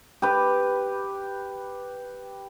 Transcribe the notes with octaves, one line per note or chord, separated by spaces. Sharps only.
G4 B4